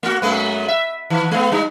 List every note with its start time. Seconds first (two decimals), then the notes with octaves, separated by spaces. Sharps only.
0.03 A3 F#4
0.22 F#2 G#3 B3
0.68 E5
1.10 D#3
1.31 G#3 B3
1.52 G3 D#4